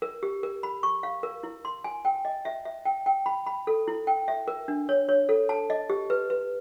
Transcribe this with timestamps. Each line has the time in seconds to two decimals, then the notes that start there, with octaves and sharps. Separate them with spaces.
0.02 A#4
0.23 G4
0.43 A#4
0.63 B5
0.83 C#6
1.03 F5
1.23 A#4
1.43 E4
1.65 C6
1.84 G#5
2.05 G5
2.25 D#5
2.45 E5
2.65 E5
2.85 G5
3.06 G5
3.26 B5
3.46 B5
3.67 A4
3.88 E4
4.07 G5
4.28 E5
4.48 A#4
4.68 D4
4.89 C#5
5.09 C#5
5.29 A4
5.49 A5
5.70 D#5
5.90 G4
6.10 B4
6.30 B4